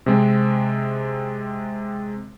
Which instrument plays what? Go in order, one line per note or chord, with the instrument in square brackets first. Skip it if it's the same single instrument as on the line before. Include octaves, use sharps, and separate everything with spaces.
[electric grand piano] C3 G#3 C4